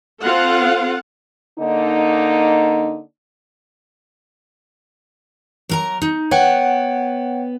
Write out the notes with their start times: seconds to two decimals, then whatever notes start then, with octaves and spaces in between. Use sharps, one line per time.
0.23 C4 F4 A4 F5 F#5
1.59 D3 A#3 D#4
5.69 F#3 A#4 A#5
6.02 D#4
6.31 B3 C#5 F#5 G5